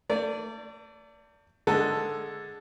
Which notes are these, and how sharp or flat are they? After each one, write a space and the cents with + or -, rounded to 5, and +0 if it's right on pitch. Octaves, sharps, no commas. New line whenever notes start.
A3 +35 D5 -20
D3 +0 G#3 +5 A4 +0